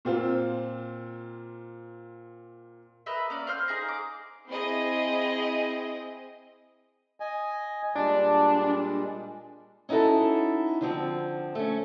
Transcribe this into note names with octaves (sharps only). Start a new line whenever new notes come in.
A#2 C4 F4
A#4 B4 D#5 E5
A#3 C#4 D5
F4 C5 F6
D#4 G#4 A#5
D6
C4 E4 G#4 D#5
D#5 G#5
A#2 G3 G#3 D4
C#4 D#4 E4 F#4 A4
D3 F3 C4
A3 C#4